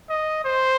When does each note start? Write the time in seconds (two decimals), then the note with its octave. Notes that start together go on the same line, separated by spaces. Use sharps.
0.09 D#5
0.44 C5